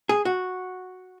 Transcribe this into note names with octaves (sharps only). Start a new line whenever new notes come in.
G#4
F#4